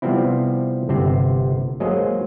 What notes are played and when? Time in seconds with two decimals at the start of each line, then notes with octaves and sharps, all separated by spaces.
0.02 C3 F3 G3 B3 C4 E4
0.89 G1 C3 C4 C5
1.80 F#3 G#3 A#3 G#4 C5 D#5